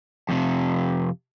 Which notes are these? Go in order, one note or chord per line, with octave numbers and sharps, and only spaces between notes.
F2 C3